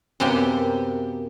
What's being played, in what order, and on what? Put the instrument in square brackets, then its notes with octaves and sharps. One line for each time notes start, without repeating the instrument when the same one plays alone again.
[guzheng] F#2 C3 A#3 B3 G4 G5